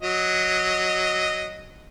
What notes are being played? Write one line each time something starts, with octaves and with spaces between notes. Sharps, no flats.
F#3 D#5